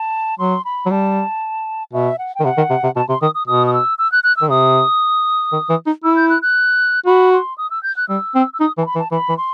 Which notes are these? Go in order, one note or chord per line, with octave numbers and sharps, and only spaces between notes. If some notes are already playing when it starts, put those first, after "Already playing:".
Already playing: A5
F#3 C6
B5
F#3
G3 A5
B2 E5
F#5
G5
D#3
C3 F#5
D#3
C3
C3
B2 A5
C3 C6
D#3 D#6
D#6
B2 D#6
D#6
E6
E6
F#6
F#6
D#3 E6
C3 D#6
D#3
E3
D#4
E4 E6
G6
F#6
F#6
F#4 B5
C6
D#6
E6
G6
F#6
G3 E6
C4
E6
D#4 D#6
E3
A5
B5
E3
A5
E3 B5
E3
C6